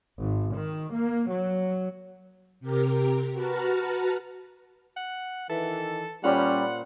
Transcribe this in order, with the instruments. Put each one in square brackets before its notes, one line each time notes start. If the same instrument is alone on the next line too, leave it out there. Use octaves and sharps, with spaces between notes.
[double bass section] G#1
D#3
A#3
F#3
[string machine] C3 G4 A#4
F#4 B4 A5 A#5 F6
[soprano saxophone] F#5
[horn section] D#3 E3 [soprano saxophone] A4
[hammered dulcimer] A#2 C5 B5 [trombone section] G3 [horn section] C#4 [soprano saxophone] F#5